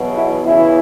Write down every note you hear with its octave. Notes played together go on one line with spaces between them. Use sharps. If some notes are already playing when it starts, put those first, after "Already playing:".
Already playing: E2 B2 F#3
E4
E2 C#3 E3 E4